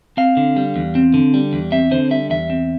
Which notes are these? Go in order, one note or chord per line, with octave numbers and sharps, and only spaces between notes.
C4 F5
D3
G3
E2
C4
D3
G3
E2
C4 E5
D3 C5
G3 E5
E2 E5
C4